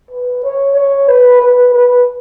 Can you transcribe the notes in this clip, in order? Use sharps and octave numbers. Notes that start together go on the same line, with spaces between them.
B4
C#5
C#5
B4
B4
B4